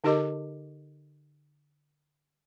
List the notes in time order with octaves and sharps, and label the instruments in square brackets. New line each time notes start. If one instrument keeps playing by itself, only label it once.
[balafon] D3 D#4 G4 A#4 D#5 D6